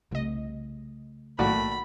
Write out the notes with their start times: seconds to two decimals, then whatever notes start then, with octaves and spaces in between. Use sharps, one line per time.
0.11 C2 C#3 A3 D#5
1.39 B1 A2 A#3 F#4 D5 B5